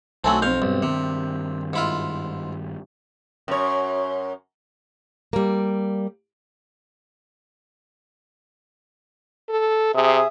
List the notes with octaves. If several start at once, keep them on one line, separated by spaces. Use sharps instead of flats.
B1 F#3 A3 C4 G#5 A5
F2 C4 F5 G6
B1 G2 G3
G2 C3 D#3
G#2 E4 F4
F#2 C#5
G3 A#3
A4
C3 G#4 E5 D#6